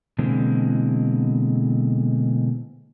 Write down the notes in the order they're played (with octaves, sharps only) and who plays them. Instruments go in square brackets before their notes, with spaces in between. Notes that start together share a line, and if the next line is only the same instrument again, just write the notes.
[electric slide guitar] B2 D3 E3 G#3 A#3 C4